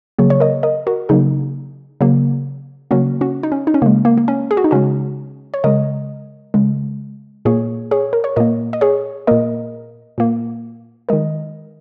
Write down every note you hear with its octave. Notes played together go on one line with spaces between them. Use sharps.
C#3 F#3 A#3 G#4 C#5
C#5
A#4 D#5
A#4 D#5
F#4 A#4
C#3 F#3 A#3 D#4 G#4
C#3 F#3 A#3
C#3 F#3 A#3 C#4 F#4
C#4 F#4
D#4
C#4
D#4
C#4
C#3 G#3 A#3
A#3
A#3
C#4
G#4
F#4
D#4
C#3 G#3 C#4 F#4
C#5
C#3 G#3 A#4 D#5
C#3 G#3
A#2 A#3 G#4 C#5
G#4 C#5
A#4
C#5
A#2 A#3 A#4 D#5
D#5
G#4 C#5
A#2 A#3 A#4 D#5
A#2 A#3
D#3 G#3 A#4 D#5